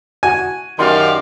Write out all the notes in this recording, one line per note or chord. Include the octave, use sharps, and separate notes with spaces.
F#4 G#5
F#2 D#3 G4 D5 F5 C6